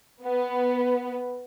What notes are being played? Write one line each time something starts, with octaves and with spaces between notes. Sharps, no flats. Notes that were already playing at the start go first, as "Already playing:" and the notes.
B3